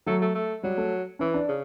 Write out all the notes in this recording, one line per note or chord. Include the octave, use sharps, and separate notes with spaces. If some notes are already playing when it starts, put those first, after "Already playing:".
F#3 A3
A3
A3
F#3 G3
A3
E3 C#4
D4
C#3